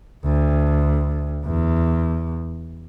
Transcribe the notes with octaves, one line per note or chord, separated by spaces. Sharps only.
D2
E2